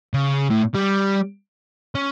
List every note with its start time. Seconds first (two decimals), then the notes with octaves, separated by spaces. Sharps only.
0.14 C#3
0.50 A2
0.75 G3
1.95 C#4